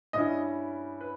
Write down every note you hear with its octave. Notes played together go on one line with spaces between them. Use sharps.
G2 G3 C#4 E4 D#5
B4